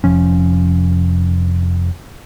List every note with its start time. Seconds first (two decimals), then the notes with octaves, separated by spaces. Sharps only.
0.04 F1 F3 C#4